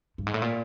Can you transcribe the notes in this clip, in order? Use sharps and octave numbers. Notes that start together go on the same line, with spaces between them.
G2
G#2
A2
A#2